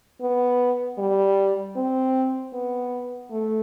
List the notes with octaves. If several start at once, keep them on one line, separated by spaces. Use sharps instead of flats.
B3
G3
C4
B3
A3